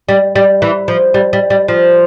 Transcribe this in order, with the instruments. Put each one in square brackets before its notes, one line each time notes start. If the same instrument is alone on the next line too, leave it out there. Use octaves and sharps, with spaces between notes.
[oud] G3
G3
E3
F3
G3
G3
G3
F3